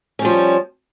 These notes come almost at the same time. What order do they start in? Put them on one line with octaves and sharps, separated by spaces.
C#4 G3 F3